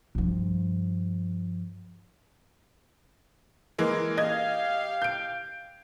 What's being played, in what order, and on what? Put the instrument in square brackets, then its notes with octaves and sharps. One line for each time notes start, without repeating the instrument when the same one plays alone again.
[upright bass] G2 F3
[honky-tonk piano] E3 G#3 A#3
[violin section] G4 F5 [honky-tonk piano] D#5 G#6
[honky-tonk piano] G6 D7